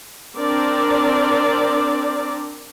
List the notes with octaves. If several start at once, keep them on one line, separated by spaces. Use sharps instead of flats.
C4 D4 A#4 D5